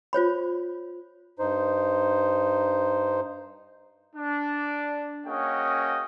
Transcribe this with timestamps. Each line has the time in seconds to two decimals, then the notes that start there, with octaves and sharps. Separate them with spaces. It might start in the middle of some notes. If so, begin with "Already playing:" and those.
0.13 F4 C5 C#5 B5
1.39 G2 D#4 C5
4.16 D4
5.27 A#3 C#4 F#4 G#4 D#5 G5